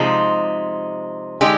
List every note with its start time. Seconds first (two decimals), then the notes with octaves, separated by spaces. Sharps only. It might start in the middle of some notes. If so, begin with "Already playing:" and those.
Already playing: C3 F3 G#3 D#4
1.41 D3 G#3 D#4 G4